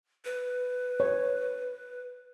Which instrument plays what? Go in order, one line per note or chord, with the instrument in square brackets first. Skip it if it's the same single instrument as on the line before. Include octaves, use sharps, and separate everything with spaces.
[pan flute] B4
[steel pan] C#5